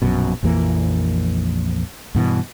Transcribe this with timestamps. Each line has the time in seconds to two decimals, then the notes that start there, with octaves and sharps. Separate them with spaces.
0.02 A#1 F#2 B2
0.43 A#1 F2 E3 A#3
2.15 G2 B2 E3